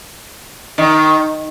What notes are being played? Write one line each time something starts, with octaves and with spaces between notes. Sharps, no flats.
D#3